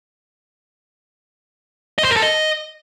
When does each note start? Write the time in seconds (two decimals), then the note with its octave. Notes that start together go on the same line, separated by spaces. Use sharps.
1.98 D#5
2.04 C5
2.10 A#4
2.16 A4
2.22 D#5